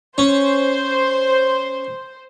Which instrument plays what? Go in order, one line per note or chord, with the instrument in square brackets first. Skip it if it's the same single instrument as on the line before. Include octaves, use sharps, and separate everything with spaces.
[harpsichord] C#4 [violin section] C5